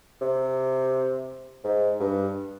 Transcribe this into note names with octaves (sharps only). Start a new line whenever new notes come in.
C3
G#2
G2